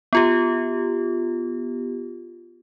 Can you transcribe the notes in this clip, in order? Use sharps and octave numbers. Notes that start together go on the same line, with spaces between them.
B3 F4 G4